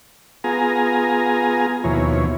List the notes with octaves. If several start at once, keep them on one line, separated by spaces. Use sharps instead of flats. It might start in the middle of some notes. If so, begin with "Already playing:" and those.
B3 F4 G#4 G#5 A#5
D#2 B2 F3 E4 C#5